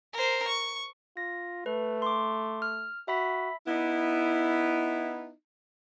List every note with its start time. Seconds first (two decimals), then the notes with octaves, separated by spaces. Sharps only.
0.13 A#4 C5
0.47 C#6
1.17 F4 A#6
1.66 A3 B4
2.02 C6 D6
2.62 F6
3.08 F#4 E5 B5 B6
3.67 B3 D#4 E4